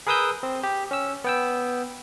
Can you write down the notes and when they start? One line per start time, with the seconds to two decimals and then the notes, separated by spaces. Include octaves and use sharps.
0.07 G#4 A#4 B4 D#6 E6 G6
0.43 C4
0.63 G4
0.91 C#4 E6
1.24 B3 G5 E6